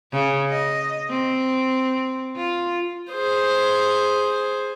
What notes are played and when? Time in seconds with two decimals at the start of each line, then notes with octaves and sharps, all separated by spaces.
0.12 C#3
0.50 D#5
1.10 C4
2.36 F4
3.11 G#4 C5